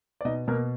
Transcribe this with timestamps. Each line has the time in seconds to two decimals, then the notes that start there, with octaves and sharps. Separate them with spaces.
0.21 D5
0.25 B2 D#4 D#5
0.48 B2 A#3 A#4